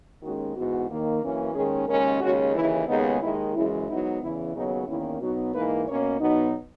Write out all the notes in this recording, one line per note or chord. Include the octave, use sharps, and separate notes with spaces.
D#2 D#3 G#3 C#4 F#4
G#2 E3 B3 F#4
D#2 D#3 A#3
F#2 E3 A#3 C#4
D#2 D#3 G#3 C#4 G#4
D#2 C#3 G#3 C#4 A#4
D#2 C#3 G#3 C#4 F#4
D#2 C#3 E3 E4
D#2 C#3 G#3 B3 D#4
D#2 D#3 G#3 E4
F#2 C#3 E3 G#3 E4
G#2 F#3 B3 D#4 E4
E2 C#3 E3 E4
D#2 C#3 F#3 B3 D#4
E2 D#3 A#3 C#4 E4
B2 F#3 B3 D#4 F#4
G#2 E3 A#3 D#4 B4
B2 A#3 C#4 C#5
B2 F#3 B3 D#4